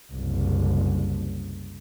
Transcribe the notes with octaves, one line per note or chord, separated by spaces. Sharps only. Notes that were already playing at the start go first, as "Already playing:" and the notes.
F#1 C2